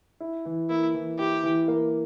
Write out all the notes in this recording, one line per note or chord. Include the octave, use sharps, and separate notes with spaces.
E4
E3
A#3 E4
E3
E4 G4
E3
A#3